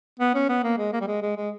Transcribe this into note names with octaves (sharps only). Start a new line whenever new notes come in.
B3
C#4
B3
A#3
G#3
A#3
G3
G#3
G#3
G#3